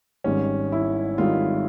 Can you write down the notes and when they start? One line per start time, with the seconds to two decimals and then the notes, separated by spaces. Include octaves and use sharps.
0.24 G#1 G#2 D#3 G3 C#4
0.72 E4
1.18 G#1 G#2 D#3 G3 F4